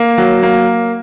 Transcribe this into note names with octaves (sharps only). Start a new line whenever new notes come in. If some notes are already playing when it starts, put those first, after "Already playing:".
Already playing: A#3
F#3
A#3